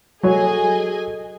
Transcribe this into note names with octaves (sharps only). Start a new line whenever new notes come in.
F#3 G#4 A4 C#5 D#5 G#5